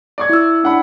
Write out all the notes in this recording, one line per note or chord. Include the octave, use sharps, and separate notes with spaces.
D5 C#6 G#6
E4 E6
D4 F#5 B5